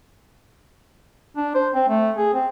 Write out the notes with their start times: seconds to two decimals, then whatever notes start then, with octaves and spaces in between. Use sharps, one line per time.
1.37 D4
1.55 C5
1.75 C4
1.89 A3
2.17 G#4
2.34 C4